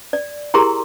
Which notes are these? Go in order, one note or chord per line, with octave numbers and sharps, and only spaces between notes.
D5
E4 G4 G#4 A#4 A#5 C6